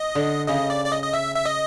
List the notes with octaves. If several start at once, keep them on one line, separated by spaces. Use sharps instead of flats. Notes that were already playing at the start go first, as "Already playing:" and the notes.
Already playing: D#5
D3
C#3 D#5
D5
D5
D#5
D#5
E5
E5
D#5